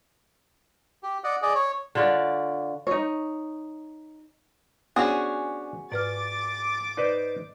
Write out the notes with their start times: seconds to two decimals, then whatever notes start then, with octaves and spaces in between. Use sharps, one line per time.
1.03 G4
1.24 D5 D#5 F#5
1.42 G#4 D5 D#5
1.55 C#5
1.95 D3 F4 C#5 D5
2.87 D#4 C#5
4.96 B3 C#4 D4 F#4 G#4 C5
5.92 G#2 B4 D5 D6 F6 A6
6.97 D#4 B4 C5 D5